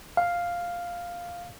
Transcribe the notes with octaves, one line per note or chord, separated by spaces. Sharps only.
F5